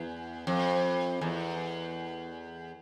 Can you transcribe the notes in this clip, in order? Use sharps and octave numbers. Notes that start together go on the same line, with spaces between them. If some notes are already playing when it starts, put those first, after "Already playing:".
Already playing: E2
F2
E2